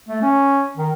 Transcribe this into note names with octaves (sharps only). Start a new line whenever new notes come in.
A3
C#4
D#3